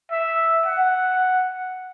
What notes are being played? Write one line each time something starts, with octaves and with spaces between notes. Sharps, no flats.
E5
F#5